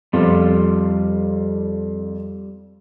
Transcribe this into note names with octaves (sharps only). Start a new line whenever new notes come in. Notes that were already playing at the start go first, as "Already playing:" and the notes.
F2 G3 F4